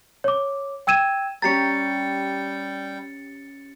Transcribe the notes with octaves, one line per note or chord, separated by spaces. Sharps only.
C#5 D6
G5 E6 G#6 D#7 E7
G3 C#4 G4 G5 A#5 A6 C7 C#7